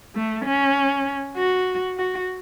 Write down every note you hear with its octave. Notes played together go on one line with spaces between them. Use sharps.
A3
C#4
F#4
F#4